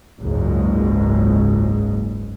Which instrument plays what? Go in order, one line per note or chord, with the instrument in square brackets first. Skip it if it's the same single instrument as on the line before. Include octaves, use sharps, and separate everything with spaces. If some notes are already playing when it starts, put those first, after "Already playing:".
[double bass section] F#1 C#2 G#2